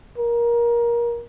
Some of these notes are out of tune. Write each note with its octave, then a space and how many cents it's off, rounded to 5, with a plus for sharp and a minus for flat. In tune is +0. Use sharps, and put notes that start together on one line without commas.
A#4 +20